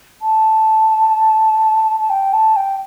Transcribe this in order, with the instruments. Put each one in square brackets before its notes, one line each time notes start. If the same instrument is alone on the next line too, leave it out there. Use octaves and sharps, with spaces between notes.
[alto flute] A5
A5
G5
A5
G5